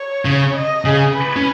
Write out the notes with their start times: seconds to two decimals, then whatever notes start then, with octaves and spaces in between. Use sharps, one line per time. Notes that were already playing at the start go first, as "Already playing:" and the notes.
Already playing: C#5
0.25 C#3
0.55 D#5
0.85 C#3 G#4
1.15 B4
1.36 C#4